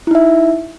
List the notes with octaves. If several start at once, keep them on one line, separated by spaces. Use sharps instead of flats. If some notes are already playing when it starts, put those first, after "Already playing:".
D#4 E4 E5